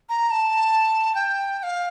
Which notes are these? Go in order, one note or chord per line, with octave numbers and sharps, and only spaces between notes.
A#5
A5
G5
G5
F5